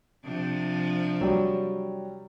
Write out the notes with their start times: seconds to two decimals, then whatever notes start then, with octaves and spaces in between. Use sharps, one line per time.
0.24 C3 F3 D4
1.21 F#3 G3